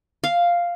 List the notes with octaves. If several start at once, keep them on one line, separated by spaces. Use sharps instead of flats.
F5